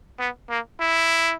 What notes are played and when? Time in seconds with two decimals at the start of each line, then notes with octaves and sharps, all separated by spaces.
0.20 B3
0.50 A#3
0.80 E4